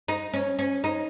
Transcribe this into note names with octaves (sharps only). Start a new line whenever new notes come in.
D#4
C#4
C#4
D#4